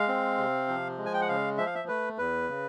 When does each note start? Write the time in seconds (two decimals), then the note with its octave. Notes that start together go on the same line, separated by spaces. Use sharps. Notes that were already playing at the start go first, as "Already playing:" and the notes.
Already playing: G#3 F5
0.08 C4
0.38 C3
0.68 F3
0.98 G#3
1.06 G#5
1.13 G5
1.21 F#5
1.28 C#3 F5
1.58 F3 E5
1.66 F5
1.75 E5
1.88 A3 B4
2.18 E2 B4
2.49 C#3